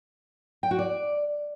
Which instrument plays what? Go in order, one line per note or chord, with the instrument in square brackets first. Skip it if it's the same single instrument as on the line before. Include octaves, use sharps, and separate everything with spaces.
[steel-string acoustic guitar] G5
F#4
D5